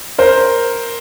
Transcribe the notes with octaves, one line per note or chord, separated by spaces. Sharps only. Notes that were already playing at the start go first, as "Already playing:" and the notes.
A#4 C5